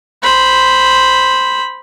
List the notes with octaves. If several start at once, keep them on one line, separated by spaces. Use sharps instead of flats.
C5 B5